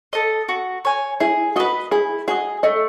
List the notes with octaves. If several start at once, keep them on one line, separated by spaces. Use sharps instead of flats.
A4 D#5
F#4
C#5 G#5
E4 G#4
F#4 B4 D#5
E4 G#4
F#4 G#4 D#5
A3 D#5